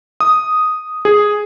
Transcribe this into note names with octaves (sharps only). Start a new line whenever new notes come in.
D#6
G#4